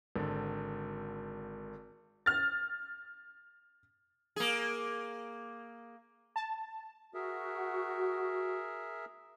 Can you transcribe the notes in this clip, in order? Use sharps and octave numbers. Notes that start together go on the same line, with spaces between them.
G#1 D3
F6 A6
A#3 G#4
A5
F#4 G#4 A#4 E5